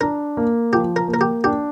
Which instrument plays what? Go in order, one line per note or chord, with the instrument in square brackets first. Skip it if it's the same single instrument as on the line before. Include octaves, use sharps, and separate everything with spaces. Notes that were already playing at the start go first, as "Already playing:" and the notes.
[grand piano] D4 [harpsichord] A#4
[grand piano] A#3
[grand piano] F3 [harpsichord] G4
[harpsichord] A#4
[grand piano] A#3
[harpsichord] A#4
G4
[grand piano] D4 [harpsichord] G4